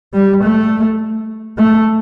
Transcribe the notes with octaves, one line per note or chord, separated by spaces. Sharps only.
G3
A3
A3